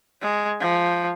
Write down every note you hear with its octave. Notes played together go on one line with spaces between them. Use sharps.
G#3
F3